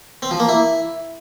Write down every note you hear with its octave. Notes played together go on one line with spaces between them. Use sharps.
C4
F3
A#3
E4